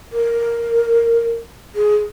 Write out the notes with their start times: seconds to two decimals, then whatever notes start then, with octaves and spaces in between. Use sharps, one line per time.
0.13 A#4
1.75 G#4